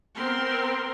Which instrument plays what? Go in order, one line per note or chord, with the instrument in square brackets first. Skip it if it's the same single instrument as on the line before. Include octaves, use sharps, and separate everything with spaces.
[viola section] B3 C4 A#4 C6